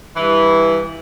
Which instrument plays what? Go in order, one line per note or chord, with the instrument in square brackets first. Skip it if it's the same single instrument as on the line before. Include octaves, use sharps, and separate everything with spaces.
[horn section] G2 E3